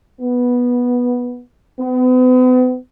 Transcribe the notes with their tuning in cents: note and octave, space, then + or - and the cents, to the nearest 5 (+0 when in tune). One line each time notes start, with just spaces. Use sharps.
B3 -10
B3 +40